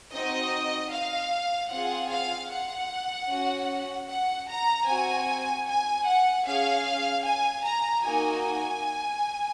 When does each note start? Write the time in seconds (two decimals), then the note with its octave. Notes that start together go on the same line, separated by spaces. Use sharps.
0.13 C4 D#4 F#4 D#5
0.92 F5
1.70 C4 F4 G#4 F#5
2.10 F5
2.50 F#5
3.29 C#4 F#4
4.08 F#5
4.48 A#5
4.87 C4 F#4 G#5
5.67 G#5
6.06 F#5
6.46 C#4 G#4 F5
7.24 G#5
7.64 A#5
8.04 A#3 D#4 F#4 G#5